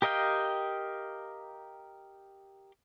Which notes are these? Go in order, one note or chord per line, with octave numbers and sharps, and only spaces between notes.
G4 A#4 D#5 F5 G5